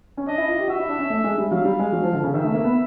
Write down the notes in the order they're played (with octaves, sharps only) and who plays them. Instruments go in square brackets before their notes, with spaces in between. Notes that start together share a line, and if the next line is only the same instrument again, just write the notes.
[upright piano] C#4
[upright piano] D4 [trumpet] D#5
[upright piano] E4
F4
G4
[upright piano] F#4 [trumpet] E5
[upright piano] E4
D4
C#4
A3
G#3
G3
[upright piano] F#3 [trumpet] F5
[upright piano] G3
G#3
F#3
F3
D3
C#3
[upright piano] D#3 [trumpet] E5
[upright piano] A3
A#3
B3